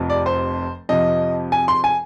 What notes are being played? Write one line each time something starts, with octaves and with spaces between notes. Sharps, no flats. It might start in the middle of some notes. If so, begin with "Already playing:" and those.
Already playing: F1 F2 C3 F3
D5
C5
F2 C3 F3 D#5
G#5
C6
G#5